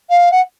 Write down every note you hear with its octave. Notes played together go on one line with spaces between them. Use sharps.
F5
F#5